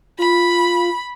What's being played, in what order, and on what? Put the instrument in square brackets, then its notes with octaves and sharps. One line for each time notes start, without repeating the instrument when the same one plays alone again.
[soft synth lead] F4 [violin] B5